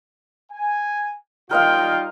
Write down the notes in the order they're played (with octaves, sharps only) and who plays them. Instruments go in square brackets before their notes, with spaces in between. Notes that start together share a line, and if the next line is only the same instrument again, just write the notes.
[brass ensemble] G#5
[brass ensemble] G3 D#4 F4 [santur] A#4 D#5 F5 [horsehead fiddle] G5